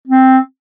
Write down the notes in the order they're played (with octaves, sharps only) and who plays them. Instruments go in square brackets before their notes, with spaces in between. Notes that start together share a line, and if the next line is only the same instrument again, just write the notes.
[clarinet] C4